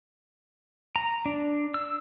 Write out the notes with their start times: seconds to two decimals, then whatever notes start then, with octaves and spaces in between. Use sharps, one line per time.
0.96 A#5
1.26 D4
1.74 E6